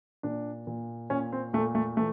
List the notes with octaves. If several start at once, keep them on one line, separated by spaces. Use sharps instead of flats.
A#2 D4
A#2
A#2 C#4
C4
A#2 A3
A3
E3 A3